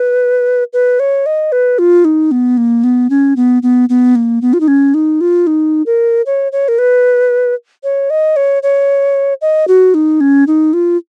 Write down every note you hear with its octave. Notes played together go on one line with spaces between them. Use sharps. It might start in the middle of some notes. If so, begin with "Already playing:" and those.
Already playing: B4
B4
C#5
D#5
B4
F4
D#4
B3
A#3
B3
C#4
B3
B3
B3
A#3
B3
F4
D#4
C#4
D#4
F4
D#4
A#4
C#5
C#5
A#4
B4
C#5
D#5
C#5
C#5
D#5
F#4
D#4
C#4
D#4
F4